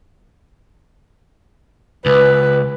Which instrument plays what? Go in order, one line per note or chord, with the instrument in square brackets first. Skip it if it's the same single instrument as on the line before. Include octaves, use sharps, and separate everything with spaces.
[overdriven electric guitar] C#2 [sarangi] B4